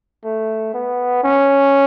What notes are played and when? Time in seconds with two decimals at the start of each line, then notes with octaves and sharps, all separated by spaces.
0.25 A3
0.74 B3
1.24 C#4